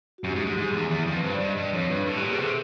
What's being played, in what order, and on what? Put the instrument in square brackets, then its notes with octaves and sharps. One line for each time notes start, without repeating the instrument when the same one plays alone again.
[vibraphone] F#4
[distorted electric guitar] F#2 [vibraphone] G4
[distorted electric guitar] G#2
[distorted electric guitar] G#2 [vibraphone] G4
[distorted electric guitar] G#2 [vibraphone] G#4
[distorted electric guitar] E2
E2
F2
[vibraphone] B4
[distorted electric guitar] G2 [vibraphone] C5
[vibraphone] D5
[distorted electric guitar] G2
[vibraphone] D#5
[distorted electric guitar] G2 [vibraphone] D5
[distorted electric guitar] F2 [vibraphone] C#5
[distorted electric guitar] G2 [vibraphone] B4
[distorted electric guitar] A2
[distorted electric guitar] B2 [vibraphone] G4
[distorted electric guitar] A#2
[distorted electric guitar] B2 [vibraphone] G#4
[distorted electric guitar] C3 [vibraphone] A4